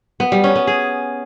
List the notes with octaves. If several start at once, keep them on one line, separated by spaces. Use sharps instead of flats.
B3
G3
C#4
B3
G#4